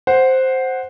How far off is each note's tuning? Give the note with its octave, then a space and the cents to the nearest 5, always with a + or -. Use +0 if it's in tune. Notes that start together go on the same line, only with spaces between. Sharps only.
C5 +0 F#5 +0